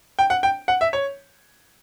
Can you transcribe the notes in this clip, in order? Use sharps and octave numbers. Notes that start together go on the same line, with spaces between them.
G5
F#5
G5
F#5
E5
C#5